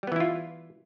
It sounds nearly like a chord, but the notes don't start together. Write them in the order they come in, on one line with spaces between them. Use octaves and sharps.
G3 B3 E3 E4 F4